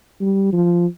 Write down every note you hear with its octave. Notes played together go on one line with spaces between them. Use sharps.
G3
F3